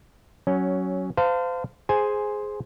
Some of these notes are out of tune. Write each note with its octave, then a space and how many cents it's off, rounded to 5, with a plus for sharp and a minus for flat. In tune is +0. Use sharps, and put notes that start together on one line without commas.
F#3 +10 C#4 +0
C5 -35 F5 +0 A5 +30
G#4 +5 C5 +0 G#5 +0